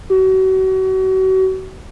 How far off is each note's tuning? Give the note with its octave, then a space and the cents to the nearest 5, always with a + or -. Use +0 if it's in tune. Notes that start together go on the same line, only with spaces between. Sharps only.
F#4 +35